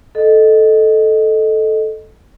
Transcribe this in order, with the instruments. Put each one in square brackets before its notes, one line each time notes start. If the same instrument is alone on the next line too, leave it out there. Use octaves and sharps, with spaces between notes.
[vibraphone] A4 D#5